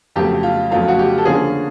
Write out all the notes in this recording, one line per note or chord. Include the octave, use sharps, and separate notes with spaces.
F2 C#3 F#3 A3 G4
F4
F2 C#3 F#3 A3 F4
F#4
G4
A4
D3 F3 A#3 C#4 G#4